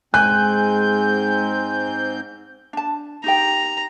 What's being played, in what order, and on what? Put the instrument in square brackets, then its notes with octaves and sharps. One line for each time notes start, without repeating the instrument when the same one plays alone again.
[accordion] G#2 C4 G6 [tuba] G#3 [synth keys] G#5 [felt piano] F#6
[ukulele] D4 A5
[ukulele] D#4 G4 G5 [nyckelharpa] A#5